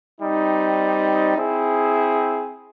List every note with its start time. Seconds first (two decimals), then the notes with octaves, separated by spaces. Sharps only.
0.21 G3 C4 D#4
1.36 C4 E4 G#4